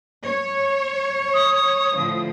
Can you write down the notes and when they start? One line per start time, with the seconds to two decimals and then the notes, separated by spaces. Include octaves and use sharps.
0.25 C#5
1.34 D#6
1.95 A2 D3 F3